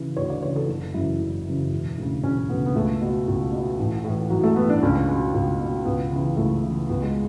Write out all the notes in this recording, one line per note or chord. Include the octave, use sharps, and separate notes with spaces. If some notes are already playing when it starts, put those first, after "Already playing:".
Already playing: C#3 E3
D2 C#5
D5
C#3 E3 C#5
A4
F#1
F#2 C#3 E3 E4
F#1
F#2 C#3 E3
E1
D2 C#3
E1 C#4
D2 C#3 B3
B3
C#2 A3
B2
C#2
B2
A1
A2 E3
A1 F#3
A3
A2 E3 B3
D4
C#2 C#4
B2 C#4
C#2
B2
C#2 B3
C#3 E3
C#2 A3
C#3 E3
C#2 B3
G#3